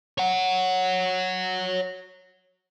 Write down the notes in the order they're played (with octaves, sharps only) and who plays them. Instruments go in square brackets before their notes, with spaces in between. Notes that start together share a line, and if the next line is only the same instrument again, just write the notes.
[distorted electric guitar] C#5 F#5